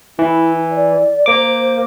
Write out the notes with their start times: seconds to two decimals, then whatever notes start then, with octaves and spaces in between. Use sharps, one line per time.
0.19 E3 E4
0.71 D5
1.26 A#3 C5 D6